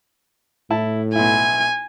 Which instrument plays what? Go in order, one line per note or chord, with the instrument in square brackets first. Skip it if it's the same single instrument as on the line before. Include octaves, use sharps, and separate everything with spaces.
[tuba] A2 [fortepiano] E4 A5
[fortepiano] B1 E4 [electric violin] G#5